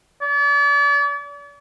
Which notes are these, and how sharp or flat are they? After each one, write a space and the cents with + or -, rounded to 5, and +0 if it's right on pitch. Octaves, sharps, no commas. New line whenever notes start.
D5 -40